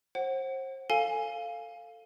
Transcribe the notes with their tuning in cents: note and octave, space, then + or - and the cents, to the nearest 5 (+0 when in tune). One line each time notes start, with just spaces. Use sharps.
C5 +30 F#5 +15
A4 +15 F5 +0 G#5 +0